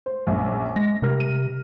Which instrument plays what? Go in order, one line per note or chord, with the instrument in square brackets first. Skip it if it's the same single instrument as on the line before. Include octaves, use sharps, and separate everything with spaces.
[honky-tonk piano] C5
A#1 F#2
[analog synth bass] G#3 [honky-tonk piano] A#6
[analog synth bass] C3 [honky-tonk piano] G3 A#4 F6
[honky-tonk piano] D#7